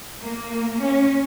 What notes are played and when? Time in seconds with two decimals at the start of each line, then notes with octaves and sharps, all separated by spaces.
0.22 A#3
0.82 C#4